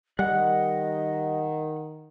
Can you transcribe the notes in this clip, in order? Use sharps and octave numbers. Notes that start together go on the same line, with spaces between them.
D#3 G3 D#5 F#5 F#6